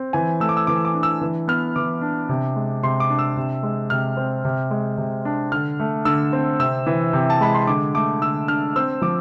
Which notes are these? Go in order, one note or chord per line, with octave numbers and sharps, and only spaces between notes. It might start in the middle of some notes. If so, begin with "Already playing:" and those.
Already playing: C4
E3 G#5
A3 E6
D6
E6
E3 D6
D6
D4
E6
E3
B3 F6
E3 D6
D4
C3
G#3
C3 C6
D6
D4
E6
C3
G#3
C3 F6
C4
C3
G#3
C3
D4
D3 F6
A3
D3 E6
C4
C3 E6
E3
C3
A5
G#3 B5
C6
D3 D6
A3 D6
D3 E6
D4 F6
C4 E6
F3 D6